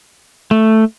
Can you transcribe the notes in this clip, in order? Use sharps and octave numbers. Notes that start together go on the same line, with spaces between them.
A3